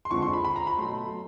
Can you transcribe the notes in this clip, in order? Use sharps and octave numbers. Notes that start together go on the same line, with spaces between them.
C6
F2 D3 F3 G#3 C4 C#6
C6
B5
B5
A#5
B5
B2 F#3 A3 C6